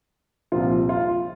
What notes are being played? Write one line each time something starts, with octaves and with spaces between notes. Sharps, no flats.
C2 A#2 F3 F4
F4